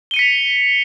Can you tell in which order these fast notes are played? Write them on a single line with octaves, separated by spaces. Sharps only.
G7 D#7 C#7 B6 F7